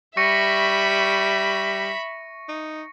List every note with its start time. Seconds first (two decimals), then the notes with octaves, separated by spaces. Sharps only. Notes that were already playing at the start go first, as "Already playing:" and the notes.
0.17 G3 E5 B5 C#6 A#6 C#7
2.49 D#4